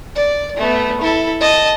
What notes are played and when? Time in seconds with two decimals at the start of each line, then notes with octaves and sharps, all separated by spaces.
0.15 D5
0.57 A3 B3
1.02 E4 A4
1.41 D#5 A5